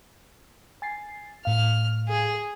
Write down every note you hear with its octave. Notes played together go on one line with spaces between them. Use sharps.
G#5 A6 C7
A2 F5 F6
G#4